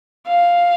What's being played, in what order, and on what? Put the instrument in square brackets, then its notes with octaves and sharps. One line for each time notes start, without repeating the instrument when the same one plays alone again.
[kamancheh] F5